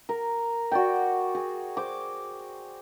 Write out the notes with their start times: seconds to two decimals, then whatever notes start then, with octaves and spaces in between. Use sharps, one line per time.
0.09 A#4
0.72 F#4 D5 G5
1.35 G#4
1.77 C5 D6